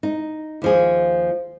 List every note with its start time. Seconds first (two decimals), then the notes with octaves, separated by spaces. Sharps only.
0.03 D#4
0.62 D#2 F3 G#4